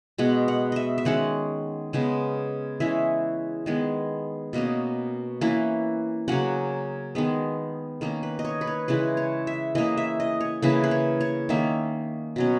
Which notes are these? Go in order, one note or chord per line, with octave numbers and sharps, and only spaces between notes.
B2 G#3 B3 F#5
F#5
D#5 E5
E5
D#3 G#3 C#4 F#5
C#3 G#3 B3
E3 G#3 C#4 E5
D#3 G#3 B3
B2 A#3 C#4 D#5
E3 A#3 C#4
C#3 F#3 A#3 C#4 F#5
D#3 G#3 B3
D#3 A#3 C#4 A#4
B4
D#5
C#5
B4
C#5
C#3 E3 G#3 B4
C#5
E5
E3 A#3 C#4 D#5
E5
D#5
C#5
C#3 E3 A#3 B4
B4
C#5
C#5
D#3 A#3 C#4 E5
B2 F#3 C#4